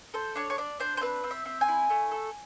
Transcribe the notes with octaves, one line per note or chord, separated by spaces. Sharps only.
A4 C5
D4 C#5
C#5
D4 D5
D4 C5
C5
C4 B4
C4
E5
C4
G#5
E4
A3
A4